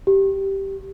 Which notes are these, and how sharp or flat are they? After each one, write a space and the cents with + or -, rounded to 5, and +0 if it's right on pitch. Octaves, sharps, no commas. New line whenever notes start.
G4 -10